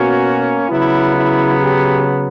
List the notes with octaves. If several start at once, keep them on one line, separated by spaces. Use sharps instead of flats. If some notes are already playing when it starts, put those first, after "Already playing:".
Already playing: B2 A#3 C#4 F#4
C#3 F#3 B3 E4
E4
G4